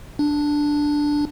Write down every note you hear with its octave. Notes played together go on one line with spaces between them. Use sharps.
D4